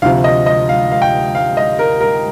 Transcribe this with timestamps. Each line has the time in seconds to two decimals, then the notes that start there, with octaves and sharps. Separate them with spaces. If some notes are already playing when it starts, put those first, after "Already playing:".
0.02 D2 C3 F3 F5
0.24 D#5
0.46 D#5
0.69 F5
0.92 F5
1.02 G5
1.35 F5
1.57 D#5
1.79 A#4
2.01 A#4